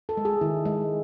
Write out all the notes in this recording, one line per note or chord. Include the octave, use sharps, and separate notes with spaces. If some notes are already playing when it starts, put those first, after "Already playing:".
A4
G#3
G#4
D#3 E4
G#3